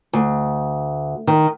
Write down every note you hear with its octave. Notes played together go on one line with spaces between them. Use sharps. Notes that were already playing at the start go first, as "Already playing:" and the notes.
D2
D#3